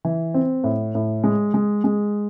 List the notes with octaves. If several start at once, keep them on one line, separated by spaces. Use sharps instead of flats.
E3
C4
A2
A2
G#3
G#3
G#3